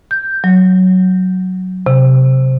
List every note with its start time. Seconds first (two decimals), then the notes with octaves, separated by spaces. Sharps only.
0.11 G6
0.44 F#3
1.86 C3